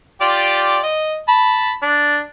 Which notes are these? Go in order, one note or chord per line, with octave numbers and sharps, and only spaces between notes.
F4 G4 D5
D#5
A5 B5
D4